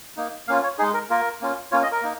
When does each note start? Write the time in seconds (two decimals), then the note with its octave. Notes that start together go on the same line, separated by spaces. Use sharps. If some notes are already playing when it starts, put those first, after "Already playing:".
0.17 A#3 D#4
0.48 A#3 C#4 F4 F5
0.63 C#5
0.79 G#3 D#4 G#4
0.94 A#4
1.10 A#3 F4 A#4
1.41 A#3 C#4 F4
1.71 A#3 C#4 F4 C#5
1.83 D#5
1.92 A#4
2.02 A#3 D#4